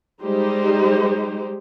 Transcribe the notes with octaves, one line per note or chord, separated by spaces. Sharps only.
G3 G#3 D#4 G4 C5